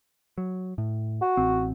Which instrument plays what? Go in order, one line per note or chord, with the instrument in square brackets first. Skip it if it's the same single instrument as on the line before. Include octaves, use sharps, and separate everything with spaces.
[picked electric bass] F#3
A2
[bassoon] F#4
[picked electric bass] A1 C4